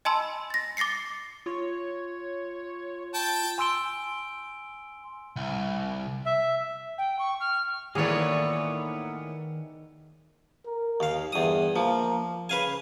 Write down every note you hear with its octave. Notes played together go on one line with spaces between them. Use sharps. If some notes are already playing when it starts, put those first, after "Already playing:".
D#5 G#5 A5 B5 C6 E6
A6 A#6
D6 A6 A#6 C7 C#7
F4 C#5
G5 A5
G#5 C6 E6 D7 G7
C2
E5
G5
C#6
F6
A2 D#3 E3 A#3 B3 G#4 C#5 D5
A#4
D#2 F5
E2 G2 D#6
F3 A#3
C#3 B4 F5 G#5